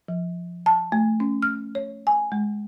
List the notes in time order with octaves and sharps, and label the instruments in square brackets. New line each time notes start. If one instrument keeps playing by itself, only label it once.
[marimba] F3
A5
A3
C#4
F6
C#5
G#5
G#3